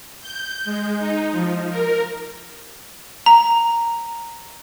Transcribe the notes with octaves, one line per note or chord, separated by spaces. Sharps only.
G6
G#3
D#4
F3
A#4
A#5